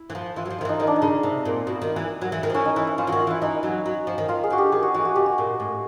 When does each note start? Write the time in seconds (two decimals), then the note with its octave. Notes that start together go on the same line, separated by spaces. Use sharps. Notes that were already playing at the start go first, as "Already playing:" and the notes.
Already playing: E4
0.10 E3
0.15 F3
0.36 E3 F4
0.45 F#3
0.50 F3
0.59 D#3 F4
0.65 E3 D#4
0.80 D#3 D#4
0.87 D4
0.96 D#4
1.02 C#3
1.23 C3
1.45 A#2
1.67 B2
1.82 D#3
1.96 E3
2.22 F#3
2.32 E3
2.43 D#3
2.50 F3
2.54 E3 C#4
2.65 D#4
2.76 E3 E4
2.87 E4
2.98 F3 F4
3.07 D#3 E3 F#4
3.20 F4
3.27 E3 E4
3.42 E3 D#4
3.63 F#3
3.86 F#3
4.07 F3
4.18 D#3
4.28 D#3 F4
4.44 G#4
4.50 D3 F#4
4.58 G4
4.72 D#3 G#4
4.83 F#4
4.94 E3 F#4
5.05 F#4
5.15 C#3 G4
5.26 F#4
5.38 A#2
5.60 A2